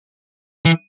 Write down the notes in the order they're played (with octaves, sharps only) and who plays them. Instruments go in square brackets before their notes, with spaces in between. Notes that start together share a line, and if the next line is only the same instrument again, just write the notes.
[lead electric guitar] E3